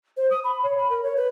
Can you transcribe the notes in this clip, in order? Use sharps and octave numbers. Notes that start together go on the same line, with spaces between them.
C5
D#6
B5
C#5
B5
A#4
C#5
B4